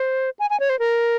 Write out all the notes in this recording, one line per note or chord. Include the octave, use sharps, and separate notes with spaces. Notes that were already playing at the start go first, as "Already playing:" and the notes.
Already playing: C5
G#5
G#5
C#5
C5
A#4